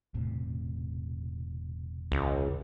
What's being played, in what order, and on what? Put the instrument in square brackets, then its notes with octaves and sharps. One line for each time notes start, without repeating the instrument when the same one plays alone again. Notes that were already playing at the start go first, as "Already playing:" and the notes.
[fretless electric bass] E1 A2 C3
[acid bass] C#2